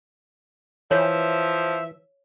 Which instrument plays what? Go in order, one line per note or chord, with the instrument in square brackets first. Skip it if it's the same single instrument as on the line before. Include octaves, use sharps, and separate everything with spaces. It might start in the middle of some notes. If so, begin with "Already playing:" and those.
[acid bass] E3 [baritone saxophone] F3 [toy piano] C#5 [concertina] E5